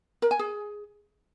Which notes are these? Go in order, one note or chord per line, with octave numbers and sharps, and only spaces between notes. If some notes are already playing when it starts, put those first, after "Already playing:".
A#4
G#5
G#4